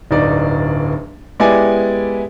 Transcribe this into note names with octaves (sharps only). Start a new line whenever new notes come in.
D1 G1 D#4 D5
G#3 B3 E4 G4 D5 G#5